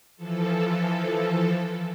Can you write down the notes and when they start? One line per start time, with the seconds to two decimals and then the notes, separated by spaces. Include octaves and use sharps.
0.16 E3 F3 A4